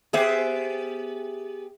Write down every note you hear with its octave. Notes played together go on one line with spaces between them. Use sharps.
B3 G4 G#4 C5 E5 F#5